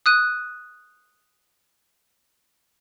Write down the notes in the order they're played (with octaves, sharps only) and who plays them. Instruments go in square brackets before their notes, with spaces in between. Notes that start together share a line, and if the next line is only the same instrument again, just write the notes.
[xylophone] D#6 F#6 D#7